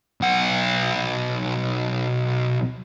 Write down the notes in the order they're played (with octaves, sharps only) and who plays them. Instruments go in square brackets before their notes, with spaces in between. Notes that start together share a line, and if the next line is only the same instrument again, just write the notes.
[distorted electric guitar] B1 F#5